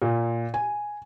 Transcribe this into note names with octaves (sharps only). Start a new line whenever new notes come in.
A#2
G#5